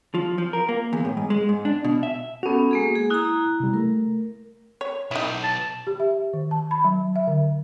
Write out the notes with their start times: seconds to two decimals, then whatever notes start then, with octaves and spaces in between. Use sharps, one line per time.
0.15 F3
0.38 F3
0.53 A#4
0.69 A#3
0.93 E2
1.05 A2
1.17 G#2
1.30 G#3
1.49 G#2
1.65 D4
1.84 B2
2.03 E5
2.43 B3 C#4 F#4 A4
2.71 G#3 A#3 G#4
2.95 G#4
3.10 E4 A#5 D#6 F#6
3.60 C3 G3
3.74 A3 A#4
4.81 C#5
5.11 B1 D#4 E4
5.44 A5
5.87 G4
6.00 E5
6.33 D#3
6.51 A5
6.71 B5
6.84 F#3
7.16 E5
7.27 D3